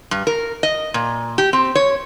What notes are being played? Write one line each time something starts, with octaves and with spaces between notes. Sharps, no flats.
G2
A#4
D#5
A#2
G4
C4
C#5